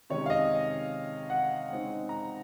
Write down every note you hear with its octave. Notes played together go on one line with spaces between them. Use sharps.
C3 D#3 G#3 C#4 C#5
F5
D#5
F#5
C#3 G#3 C4 D#4
A#5